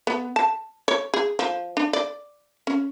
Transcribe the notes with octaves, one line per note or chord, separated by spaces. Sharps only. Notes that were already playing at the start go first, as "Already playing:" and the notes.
B3
A5
C#5
G#4
F3
D4
D5
C#4